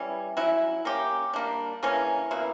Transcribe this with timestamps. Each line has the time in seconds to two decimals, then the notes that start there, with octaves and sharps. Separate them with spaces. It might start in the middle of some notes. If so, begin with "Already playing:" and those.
Already playing: E3 G3 C#4
0.37 F#3 C#4 E4
0.85 A#3 C#4 G4
1.33 G3 A#3 D4
1.83 C#3 E3 A#3 C#4
2.31 B2 A#3 E4